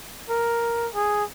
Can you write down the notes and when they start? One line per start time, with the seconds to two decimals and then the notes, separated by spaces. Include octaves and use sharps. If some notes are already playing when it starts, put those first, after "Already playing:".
0.29 A#4
0.94 G#4